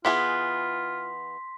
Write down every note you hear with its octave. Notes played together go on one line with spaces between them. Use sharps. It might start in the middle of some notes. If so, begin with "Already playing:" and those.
E3 B3 F4 G#4 C6 B6